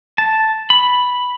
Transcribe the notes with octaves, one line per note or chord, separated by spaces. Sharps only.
A5
B5